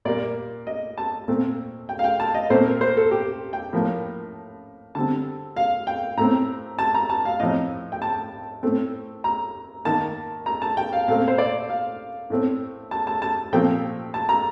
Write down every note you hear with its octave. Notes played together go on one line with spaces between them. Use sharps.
A#2 G3 A#3 D5
D#5
A5
A#2 A3 C4
G5
F5
G5
A5
D#5
A#2 A3 C4 C5
A#4
C5
A4
G4
G5
A2 F3 A#3
D3 G3 C4 A5
F5
G5
A2 A3 C4 A#5
A5
A#5
A5
F5
A2 F3 C4 D#5
G5
A5
A2 A3 C4
A#5
D#3 A#3 A5
A#5
A5
G5
F5
A#2 A3 C4 F5
C5
D5
F5
A2 A3 C4
A5
A5
A5
A#2 F3 A3 C4 G5
A5
A#5